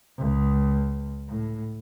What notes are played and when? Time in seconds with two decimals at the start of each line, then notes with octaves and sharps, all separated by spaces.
0.18 C#2
1.29 A2